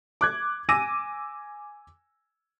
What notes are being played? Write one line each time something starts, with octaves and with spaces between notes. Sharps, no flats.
D6 F#6 G#6
G#5 D6 E6 A#6 D#7